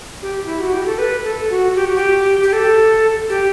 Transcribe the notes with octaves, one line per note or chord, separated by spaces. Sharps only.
G4
E4
F#4
G4
A4
B4
A4
F#4
G4
F#4
G4
G4
A4
G4